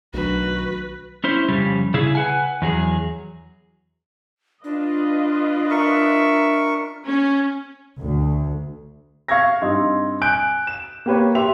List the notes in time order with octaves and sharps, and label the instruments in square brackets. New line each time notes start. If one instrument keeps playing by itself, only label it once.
[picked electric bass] B1 D#3 [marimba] F#3 A3 D4 [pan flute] F#4 [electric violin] B4
[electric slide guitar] C#4 E4 C5
F2 C#3 G3
C#3 E4 G#4
B4 F#5 G#5
E2 F#3 G#4
[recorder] D4 [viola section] F4 B4 D#5
[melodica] A#4 C#6 [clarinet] E5
[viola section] C#4
[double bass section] D2
[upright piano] F5 C#6 E6 G#6 A#6
G2 C4 D#4
G#5 F#6 G6 D7
E7
A#3 G4 B4 C#5
G4 E5 C6 F7